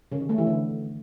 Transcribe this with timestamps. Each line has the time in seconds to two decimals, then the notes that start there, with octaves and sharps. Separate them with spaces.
0.12 C#3
0.20 D#3
0.29 A3
0.38 E3
0.47 D3